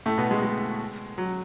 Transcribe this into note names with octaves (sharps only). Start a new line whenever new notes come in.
A2 A3
B2 B3
G#3
G#3
F#3